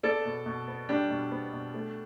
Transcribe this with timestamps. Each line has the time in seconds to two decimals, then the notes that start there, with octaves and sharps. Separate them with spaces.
0.03 B3 A4 D5
0.25 B2
0.46 B2
0.68 B3
0.89 G3 D4 G4
1.10 B2
1.32 B3
1.53 B2
1.74 A3